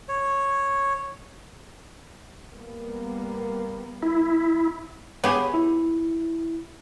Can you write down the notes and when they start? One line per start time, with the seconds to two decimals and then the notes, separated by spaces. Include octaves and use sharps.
0.09 C#5
2.54 G3 A#3 B3
4.03 E4
5.24 B3 G4 G#4 C#5 G#5
5.54 E4